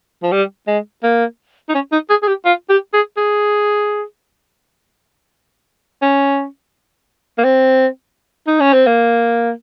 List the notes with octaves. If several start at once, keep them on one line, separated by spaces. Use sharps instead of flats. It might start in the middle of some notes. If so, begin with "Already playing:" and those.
F3
G3
G#3
A#3
D#4
C#4
D#4
G#4
G#4
G4
F4
G4
G#4
G#4
C#4
A#3
C4
D#4
C#4
C4
A#3